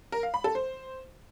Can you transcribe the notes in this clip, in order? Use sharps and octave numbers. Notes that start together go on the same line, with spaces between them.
A#4
F5
B5
A4
C5